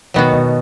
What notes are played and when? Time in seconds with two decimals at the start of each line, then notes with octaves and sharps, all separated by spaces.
0.14 B2 D#3 F#3 B3 F#4
0.33 B2